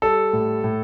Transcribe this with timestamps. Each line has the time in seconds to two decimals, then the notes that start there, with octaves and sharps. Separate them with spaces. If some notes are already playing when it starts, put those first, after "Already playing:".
0.02 G3 A4
0.33 A2
0.64 A2